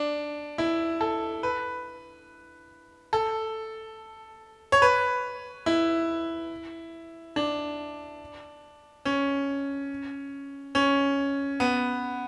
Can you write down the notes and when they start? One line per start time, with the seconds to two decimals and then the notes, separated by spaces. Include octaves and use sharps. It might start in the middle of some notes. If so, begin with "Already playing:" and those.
Already playing: D4
0.58 E4
1.01 A4
1.43 B4
3.13 A4
4.72 C#5
4.82 B4
5.66 E4
7.36 D4
9.05 C#4
10.75 C#4
11.60 B3